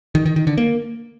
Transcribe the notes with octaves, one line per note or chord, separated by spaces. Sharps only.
D#3
D#3
D#3
D3
A#3